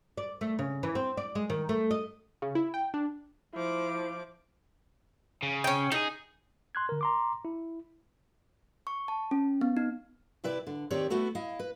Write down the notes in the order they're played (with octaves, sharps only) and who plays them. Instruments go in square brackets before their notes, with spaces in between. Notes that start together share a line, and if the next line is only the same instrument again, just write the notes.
[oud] D5
A3
C#3
E3
C4
D5
G#3
D#3
A3
D#5
[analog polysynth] C#3
E4
G5
D4
[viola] F3 D6 [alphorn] E4
[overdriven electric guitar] C#3
[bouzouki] C#4 G5
[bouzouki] D#4 [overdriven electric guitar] G#4 A4
[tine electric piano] C6 F#6 G#6
D3 A#4
A#5 C6 D6
E4
[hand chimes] C#6
A5
C#4
B3
D#4
[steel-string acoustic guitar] C3 E4 B4 D5
D3
D#2 D#3 C4 G4 C#5 D5
A3 B3 E4 F#4 A4
E4 D#5 F5
B4